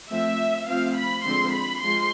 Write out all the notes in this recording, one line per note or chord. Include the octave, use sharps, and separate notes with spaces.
F3 A3 C4 E5
F3 A3 C4 F5
B5
D3 F3 G#3 C4 C6
B5
F3 G#3 C6